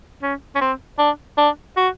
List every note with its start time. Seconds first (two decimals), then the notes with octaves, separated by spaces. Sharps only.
0.22 C#4
0.55 C#4
0.61 C4
0.98 D4
1.37 D4
1.77 F#4